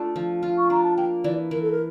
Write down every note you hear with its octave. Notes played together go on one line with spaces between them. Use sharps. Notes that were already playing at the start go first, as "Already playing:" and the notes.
Already playing: A3 D4 F4
F3
F4
C#6
D4 A#5
A5
A#3 G5
E3 D5
E3 A#4
A4
A#4